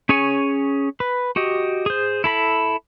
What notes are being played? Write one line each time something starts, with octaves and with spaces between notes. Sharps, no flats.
C#4 G#4 C#5 G#5 C#6
B4
F#4 G4 D#5
G#4 C5
E4 A4 B5